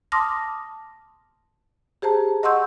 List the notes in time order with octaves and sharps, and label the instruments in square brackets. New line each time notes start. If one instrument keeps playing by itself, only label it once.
[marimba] A5 C6 D6 D#6 F6 A#6
G4 G#4 C5 A5 A#5
D#5 F#5 C6 C#6 E6 G6